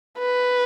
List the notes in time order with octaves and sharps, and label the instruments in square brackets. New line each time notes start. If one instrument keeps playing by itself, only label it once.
[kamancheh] B4